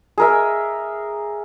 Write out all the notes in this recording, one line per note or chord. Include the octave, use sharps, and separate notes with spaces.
G#4 A#4 E5